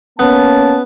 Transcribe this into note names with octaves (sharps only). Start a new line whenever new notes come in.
A#3 B3 C#4 A5